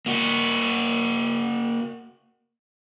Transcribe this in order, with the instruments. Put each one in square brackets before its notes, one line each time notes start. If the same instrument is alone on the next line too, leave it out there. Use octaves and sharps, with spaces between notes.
[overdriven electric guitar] A#3 F#4